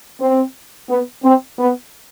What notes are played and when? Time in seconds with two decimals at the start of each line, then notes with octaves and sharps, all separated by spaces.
0.20 C4
0.89 B3
1.24 C4
1.58 B3